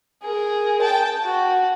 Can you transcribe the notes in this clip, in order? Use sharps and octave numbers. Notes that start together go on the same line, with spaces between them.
G#4 A#4
G5 A5
F#4